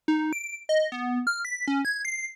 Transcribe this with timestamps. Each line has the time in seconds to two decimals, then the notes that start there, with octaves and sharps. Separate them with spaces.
0.08 D#4
0.33 D7
0.69 D#5
0.92 B3
1.27 F6
1.45 B6
1.68 C#4
1.85 G#6
2.05 C7